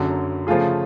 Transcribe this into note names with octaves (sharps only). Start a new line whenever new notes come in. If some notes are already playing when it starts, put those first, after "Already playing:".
Already playing: F#1 F#2 D3 F#3
C#3 F3 A3 F4 G#4